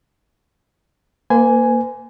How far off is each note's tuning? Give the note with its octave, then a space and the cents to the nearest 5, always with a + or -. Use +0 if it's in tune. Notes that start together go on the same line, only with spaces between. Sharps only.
A#3 +0 C5 -45 G#5 +0